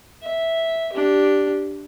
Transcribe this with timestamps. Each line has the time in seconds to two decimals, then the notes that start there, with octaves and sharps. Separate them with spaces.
0.22 E5
0.93 D4 G4